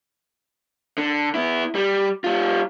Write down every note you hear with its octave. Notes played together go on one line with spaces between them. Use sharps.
D3
B3 E4
G3
G3 F4